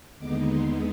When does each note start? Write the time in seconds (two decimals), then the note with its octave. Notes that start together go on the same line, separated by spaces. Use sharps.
0.18 D#2 D3 G#3 B3 D#4 D6
0.51 C6